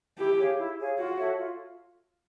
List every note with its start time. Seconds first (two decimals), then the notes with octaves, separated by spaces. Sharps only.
0.17 E4 G4
0.38 G#4 C#5 F5
0.58 E4
0.77 G#4 C#5 F5
0.98 F4 F#4
1.18 A4 C#5 E5
1.38 F4